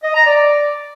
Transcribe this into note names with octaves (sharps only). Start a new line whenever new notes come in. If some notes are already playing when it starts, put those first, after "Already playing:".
D#5
A#5
D5